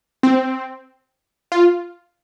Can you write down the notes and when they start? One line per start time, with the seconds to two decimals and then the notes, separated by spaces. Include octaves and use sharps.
0.23 C4
1.52 F4